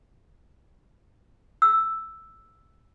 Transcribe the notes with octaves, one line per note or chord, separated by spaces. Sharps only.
E6